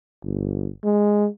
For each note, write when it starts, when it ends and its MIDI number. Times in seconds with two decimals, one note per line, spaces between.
0.24 0.70 31
0.84 1.27 56